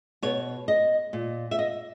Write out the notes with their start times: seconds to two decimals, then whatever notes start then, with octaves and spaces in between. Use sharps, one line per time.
0.23 B2 C#5
0.68 D#5
1.13 A#2
1.51 E5
1.59 D#5